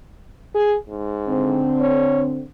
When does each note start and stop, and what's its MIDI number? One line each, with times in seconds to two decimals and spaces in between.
0.54 0.76 68
0.88 1.66 44
1.28 2.43 50
1.28 2.43 60
1.81 2.23 73